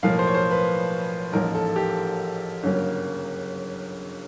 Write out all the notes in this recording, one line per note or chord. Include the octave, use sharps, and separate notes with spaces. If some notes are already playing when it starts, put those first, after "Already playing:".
B1 A2 F3 A#3 F5
C5
C#5
C5
B4
A1 G#2 F3 A#3 A#4
A4
G4
G1 F#2 C#3 F#3 A#3